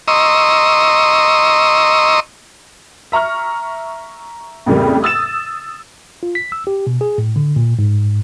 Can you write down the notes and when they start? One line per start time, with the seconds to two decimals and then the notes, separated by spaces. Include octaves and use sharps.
0.08 D#5 A#5 C6 C#6 D#6 E6
3.12 E5 A#5 C#6 F6
4.66 F2 A2 C#3 G3 A#3
5.02 D#6 E6 A6 E7
6.23 F4
6.35 B6
6.52 E6
6.67 G4
6.87 B2
7.01 G#4
7.18 A2
7.36 D3
7.56 A#2
7.79 G#2